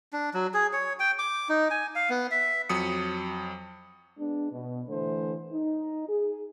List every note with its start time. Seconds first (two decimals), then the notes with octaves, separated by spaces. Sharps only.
0.13 D4
0.34 F#3
0.54 G#4
0.73 C#5
1.00 G5
1.19 D6
1.49 D#4
1.71 G#5
1.95 F5
2.10 B3
2.31 E5
2.69 F2 F#3 D#6 C#7
4.18 G#3 B3 D4
4.52 B2
4.88 D3 E3 A3 C5
5.52 D#4
6.08 G#4